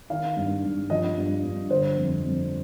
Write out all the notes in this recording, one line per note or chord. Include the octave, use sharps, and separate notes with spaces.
D#3 F5
G2
G2
F3 D#5
G2
G2
D3 C5
F2
F2